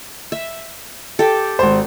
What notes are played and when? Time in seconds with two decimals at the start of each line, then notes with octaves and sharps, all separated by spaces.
0.32 E5
1.19 G4 A4
1.59 G#1 C5